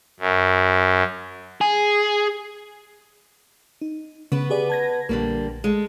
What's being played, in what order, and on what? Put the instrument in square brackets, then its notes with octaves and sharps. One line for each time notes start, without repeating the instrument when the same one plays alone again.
[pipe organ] F#2
[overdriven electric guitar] G#4
[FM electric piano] D#4
[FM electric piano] C#3 [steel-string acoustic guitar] B3 B4
[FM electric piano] G4 G#4 D5
A5 G#6 A#6
[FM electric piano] A#1 [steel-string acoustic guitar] D3 G3 A#3
[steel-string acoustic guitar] G#3 A4